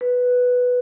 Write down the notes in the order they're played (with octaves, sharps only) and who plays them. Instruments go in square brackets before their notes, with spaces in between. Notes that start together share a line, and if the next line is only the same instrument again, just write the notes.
[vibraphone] B4